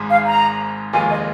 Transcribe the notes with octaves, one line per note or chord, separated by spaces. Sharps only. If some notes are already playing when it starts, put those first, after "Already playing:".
Already playing: G#1 G#2 G#3
F5
A#5
F1 D#2 D#3 G#3 F4 G#5
D#5